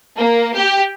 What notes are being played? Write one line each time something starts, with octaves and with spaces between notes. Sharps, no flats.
A#3
G4